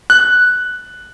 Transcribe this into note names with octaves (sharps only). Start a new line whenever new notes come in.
F#6